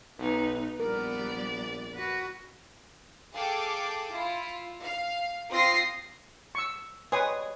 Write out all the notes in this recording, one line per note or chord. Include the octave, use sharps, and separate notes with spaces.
B1 B3 D#4
A#1 G3 B3 A#4 D5
F#4 B4
G#4 A4 F5 G5 A5 D6
E4 F4
F5
C4 F4 C6 D#6 A#6 C7
C#6 E6
G3 G#3 G#4 B4 C#5 D#6